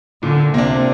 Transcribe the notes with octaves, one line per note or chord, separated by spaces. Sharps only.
A#2 D3
C3 A#3 D4